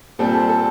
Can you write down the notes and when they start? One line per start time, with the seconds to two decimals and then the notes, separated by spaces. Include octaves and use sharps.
0.19 A#2 G3 C4 A4
0.34 A4
0.49 A4